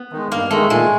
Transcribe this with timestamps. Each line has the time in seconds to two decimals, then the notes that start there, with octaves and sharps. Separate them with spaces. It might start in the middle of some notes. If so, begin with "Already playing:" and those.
Already playing: B3
0.13 D#3 G#3
0.32 G2 A#3
0.51 D#3 G#3 A3
0.70 A#2 G#3